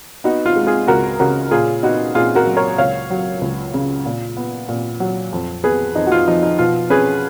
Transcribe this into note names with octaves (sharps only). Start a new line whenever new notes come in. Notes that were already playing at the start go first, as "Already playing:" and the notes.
B3 D#4 F#4
F4
G#3
F4 G#4
C#2 F#4 A#4
C#3 F#4 A#4
A#2 F4 G#4
B3 D#4 F#4
A#2 F4 G#4
F#4 A#4
F#3
A#4 C#5
C#2 C#5 F5
F#3
C#2
C#3
A#2
B3
A#2
F#3
F2
B3 G#4 B4
F2 D#4
F#4
F4
F3 D#4
D#4
B2 F4
C#4 G#4 B4